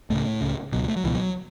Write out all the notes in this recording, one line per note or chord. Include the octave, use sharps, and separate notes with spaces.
C#2 A2 C#3 A3
C#2 C#3
C#2 B2 F#3
A3
F#3
C#2 B2 E3
F#3